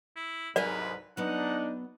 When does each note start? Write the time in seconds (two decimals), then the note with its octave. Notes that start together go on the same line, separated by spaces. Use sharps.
0.16 E4
0.56 C2 G#2 F#3 A#4 B4 D5 G#5
1.17 F#3 B3 D4 D#4 F#5